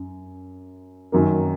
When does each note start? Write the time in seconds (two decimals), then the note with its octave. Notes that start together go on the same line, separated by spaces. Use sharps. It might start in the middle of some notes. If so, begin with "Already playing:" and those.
Already playing: F#2
1.12 F#2 D#3 F#3 A#3